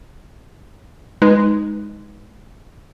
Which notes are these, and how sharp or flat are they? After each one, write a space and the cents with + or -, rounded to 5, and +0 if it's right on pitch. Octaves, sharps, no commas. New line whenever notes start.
G#3 +0 D#4 +0 B4 +0